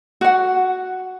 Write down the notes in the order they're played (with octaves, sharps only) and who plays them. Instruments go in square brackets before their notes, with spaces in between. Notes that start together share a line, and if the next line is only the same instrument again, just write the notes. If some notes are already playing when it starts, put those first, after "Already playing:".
[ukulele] F#4 F#5